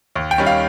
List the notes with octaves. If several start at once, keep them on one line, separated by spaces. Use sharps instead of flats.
D#2
G5
D#3 G3 C#4
F5